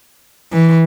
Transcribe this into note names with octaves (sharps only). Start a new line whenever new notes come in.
E3